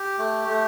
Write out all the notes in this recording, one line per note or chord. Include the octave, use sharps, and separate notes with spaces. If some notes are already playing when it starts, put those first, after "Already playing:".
Already playing: G4
A3
A3